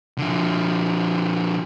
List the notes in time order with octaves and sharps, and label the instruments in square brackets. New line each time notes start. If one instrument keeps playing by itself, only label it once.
[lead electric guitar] D3 F3